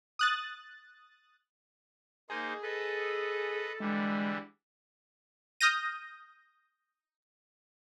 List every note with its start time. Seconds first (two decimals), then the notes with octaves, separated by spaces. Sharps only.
0.19 D#6 F#6 A6
2.30 A#3 D#4 G#4 C5
2.63 A4 B4 D#5
3.80 D3 E3 G3 G#3
5.61 D#6 F6 G6 A#6 D#7